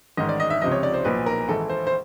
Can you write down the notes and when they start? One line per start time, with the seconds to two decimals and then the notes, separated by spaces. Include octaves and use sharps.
0.17 A1 G#2 D#3 D#5
0.29 D5
0.40 D#5
0.50 E5
0.61 C#2 C3 F3 D#5
0.72 C#5
0.83 D5
0.94 C5
1.05 B1 A#2 F3 B4
1.26 A#4
1.48 G#1 G#2 E3 A4
1.69 C5
1.87 C5